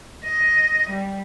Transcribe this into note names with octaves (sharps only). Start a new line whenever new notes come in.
D#5
G3